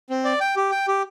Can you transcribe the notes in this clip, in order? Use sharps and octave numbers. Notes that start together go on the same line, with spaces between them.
C4
D5
G5
G4
G5
G4